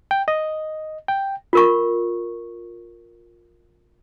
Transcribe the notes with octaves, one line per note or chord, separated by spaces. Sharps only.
G5
D#5
G5
F4 A#4 C#6